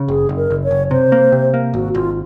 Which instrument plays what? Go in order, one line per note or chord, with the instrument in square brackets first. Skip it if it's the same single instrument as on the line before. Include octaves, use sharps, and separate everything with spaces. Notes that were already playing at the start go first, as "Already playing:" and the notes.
Already playing: [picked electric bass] C#3
[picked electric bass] F#1 [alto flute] G#4
[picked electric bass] F#1
[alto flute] A#4
[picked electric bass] F#1
[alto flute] C#5
[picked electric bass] F#1
[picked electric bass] C3 [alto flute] C5
[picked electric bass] A#3
C3
A#3
[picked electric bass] G#1 [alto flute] F#4
[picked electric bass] G#1 [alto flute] F4